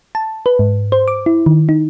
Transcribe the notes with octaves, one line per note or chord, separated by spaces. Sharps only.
A5
B4
G#2
C5
D6
E4
D#3
D#4